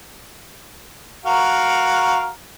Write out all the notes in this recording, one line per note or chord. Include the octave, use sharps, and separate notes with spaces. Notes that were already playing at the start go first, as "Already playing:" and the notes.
F#4 A#4 F5